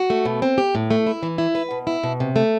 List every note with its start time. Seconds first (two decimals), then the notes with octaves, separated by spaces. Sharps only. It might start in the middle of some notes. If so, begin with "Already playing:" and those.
Already playing: F#4
0.10 A3
0.25 B2
0.42 C4
0.58 G4
0.75 A2
0.90 A3
1.06 E4
1.23 E3
1.38 E4
1.55 B4
1.71 B2
1.87 E4
2.03 B2
2.20 C3
2.36 A3